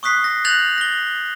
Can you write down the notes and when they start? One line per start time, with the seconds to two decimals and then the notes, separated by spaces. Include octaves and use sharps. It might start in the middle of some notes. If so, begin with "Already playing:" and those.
0.03 C#6 D#6 F#6 B6 C7
0.24 A#6
0.45 F#6 G6 A6 A#6 F7 F#7
0.78 A#6 G7